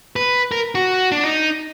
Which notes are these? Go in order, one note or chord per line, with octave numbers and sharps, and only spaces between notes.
B4
A#4
F#4
D4
D#4